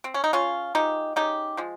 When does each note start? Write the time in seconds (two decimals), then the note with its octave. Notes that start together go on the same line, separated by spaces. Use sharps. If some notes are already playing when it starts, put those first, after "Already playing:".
0.04 C4
0.14 C#4
0.24 D#4
0.33 C#3 C#4 F4
0.75 F3 G#3 D#4 G4
1.16 C#3 D#4 G4
1.57 F3 G#3